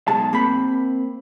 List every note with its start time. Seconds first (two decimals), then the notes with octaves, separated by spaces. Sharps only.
0.08 B1 G#3 A5
0.33 A#3 C4 B5